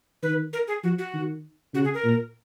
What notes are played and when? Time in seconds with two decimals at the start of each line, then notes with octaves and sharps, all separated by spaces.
0.23 D#3 B4
0.53 A#4
0.68 G#4
0.83 F3 F#4
0.98 F#4
1.14 D#3
1.74 C#3 F#4
1.84 G#4
1.94 A#4
2.04 A#2